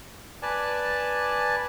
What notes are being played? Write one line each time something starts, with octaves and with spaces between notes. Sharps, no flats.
B4 D5 G#5 A5